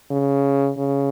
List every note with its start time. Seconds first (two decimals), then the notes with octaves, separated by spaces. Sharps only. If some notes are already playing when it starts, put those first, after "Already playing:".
0.11 C#3
0.78 C#3